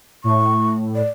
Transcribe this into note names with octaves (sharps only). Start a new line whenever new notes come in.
A2 C#6
D5